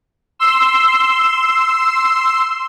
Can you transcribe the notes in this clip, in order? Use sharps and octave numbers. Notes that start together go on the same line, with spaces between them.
C6 E6